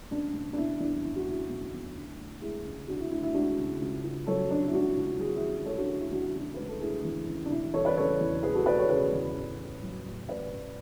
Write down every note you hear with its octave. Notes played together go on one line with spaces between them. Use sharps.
F#1 D4
F#1
D4
B2 E4
E2 D4
F#1 E4
F#4
F#1 E4
B2
E2
D2
D2
G#3 E4 G#4
C#3
D2 D4 F#4
E4
D2 E4
E4
G#3 D4 F#4
C#3
C#2
C#2
F#3 A4 C#5
C#3 D4
E4
C#2 D4 F#4
C#2
F#3 G#4
F#4
E4 G#4
C#3
G#3 A4 C#5
D4 F#4
D2 E4
E4
E3 D4 F#4
E4
C#3 D4 F#4
G#3 B4
A4
D2 E4 G#4
E3
C#3
D4
E1 E4
E4
E1 A4 C#5
B4 D5
C#3 A4 C#5
E2
E1 G#4 B4
F#4 A4
E1 B4 D5
A4 C#5
C#3 G#4 B4
E2
A1
A1
F#3
A2
A1 B4 D5
A1